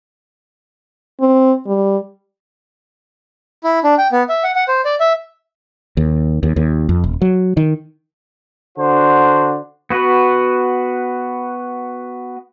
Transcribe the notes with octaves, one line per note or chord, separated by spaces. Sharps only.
C4
G3
E4
D4
G5
B3
E5
F#5
F#5
C5
D5
E5
D#2
D#2
D#2
F2
D#1
F#3
D#3
D3 D4 F#4 C5
B3 F#4 B4